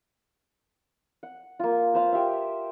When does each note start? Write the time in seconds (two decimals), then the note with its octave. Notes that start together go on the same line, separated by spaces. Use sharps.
1.23 F#5
1.59 A#3 F4
1.94 B4 C5 F5
2.12 G4 E5